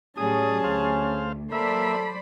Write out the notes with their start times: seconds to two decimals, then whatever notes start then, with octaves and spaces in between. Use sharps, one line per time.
0.17 A2 F#3 G3 C#4 G#4 A5 D#6
0.64 D2 C5 F5
1.52 F#3 A#3 A4 C5 D5 E5 B5